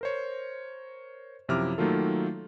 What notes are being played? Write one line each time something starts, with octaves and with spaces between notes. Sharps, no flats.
A#4 C5 C#5
F#2 C3 F3 E4 D6 F6
D#3 F#3 A3 A#3 F4 A4